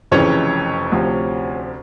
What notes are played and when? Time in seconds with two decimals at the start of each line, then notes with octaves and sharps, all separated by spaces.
0.12 F1 F2 C#3 E3 C#4 C#5
0.92 D2 C3 F3